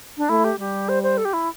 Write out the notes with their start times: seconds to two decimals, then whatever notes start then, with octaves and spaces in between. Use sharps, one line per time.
0.17 D4
0.29 A3 E4
0.44 G4
0.59 G3 G4
0.89 C5
1.03 C5
1.18 A4
1.25 G4
1.33 E4